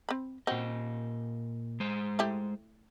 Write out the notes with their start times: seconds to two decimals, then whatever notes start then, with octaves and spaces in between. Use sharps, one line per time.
0.09 C4 B5
0.47 A#2 C4 F#4 D#5
1.80 G#3 C5
2.19 A3 E4 G4